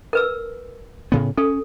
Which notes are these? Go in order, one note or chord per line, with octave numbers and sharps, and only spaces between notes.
A#4 B4 E6
A2 C#3 B3
C#4 A4